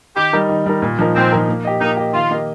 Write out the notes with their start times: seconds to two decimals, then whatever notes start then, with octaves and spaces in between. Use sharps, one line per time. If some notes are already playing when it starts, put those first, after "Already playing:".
0.16 D#3 G4
0.33 G3 D#4 A#4
0.49 D#3
0.66 G3 D#4 A#4
0.82 A#2
0.99 F3 D#4 A#4
1.15 A#2 C4
1.32 F3 D#4 A#4
1.49 A#3
1.65 G4 D#5
1.81 A#3 D#4
1.97 G4 D#5
2.13 D#3 F4
2.31 A#3 G4 D#5